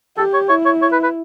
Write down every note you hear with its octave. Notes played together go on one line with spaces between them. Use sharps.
G4 A4
C#5
E4 C#5
C#5
C#5
B4
B4